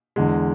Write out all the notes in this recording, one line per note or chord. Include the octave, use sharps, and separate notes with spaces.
E2 D3 G#3